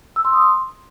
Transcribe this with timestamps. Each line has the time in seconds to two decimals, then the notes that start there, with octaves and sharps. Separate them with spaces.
0.16 E6
0.25 C6
0.33 D#6
0.42 C6